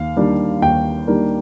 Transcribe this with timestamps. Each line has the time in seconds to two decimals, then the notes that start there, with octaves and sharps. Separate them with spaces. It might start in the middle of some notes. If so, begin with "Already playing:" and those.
Already playing: D#2 F5
0.17 D#3 G3 A#3 D4
0.62 D#2 G5
1.07 D#3 G3 A#3 D4